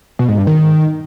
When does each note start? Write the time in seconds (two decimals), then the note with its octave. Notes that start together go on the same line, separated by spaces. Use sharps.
0.19 B2
0.28 G#2
0.38 G2
0.47 D#3